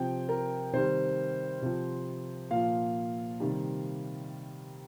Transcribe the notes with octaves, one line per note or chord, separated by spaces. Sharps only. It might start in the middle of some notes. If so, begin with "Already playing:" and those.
Already playing: C3 F3 G5
A#4
C3 D#3 G3 C5
C3 F3
A#2 F3 F5
C3 D#3 G3